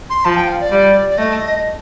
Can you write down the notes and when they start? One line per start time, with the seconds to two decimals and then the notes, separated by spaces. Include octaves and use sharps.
0.10 C6
0.25 F3 A5
0.37 G5
0.48 F5
0.60 D5
0.72 G3
1.10 D5
1.18 A3 D#5